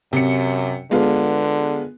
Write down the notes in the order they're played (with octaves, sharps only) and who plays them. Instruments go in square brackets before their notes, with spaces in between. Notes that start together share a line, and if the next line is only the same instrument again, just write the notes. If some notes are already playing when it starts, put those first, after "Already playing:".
[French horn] F#2 [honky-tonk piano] C3 C#7
[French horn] D3 [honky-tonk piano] G#3 B3 F4